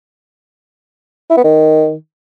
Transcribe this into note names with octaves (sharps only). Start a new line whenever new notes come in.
E4
B3
D#3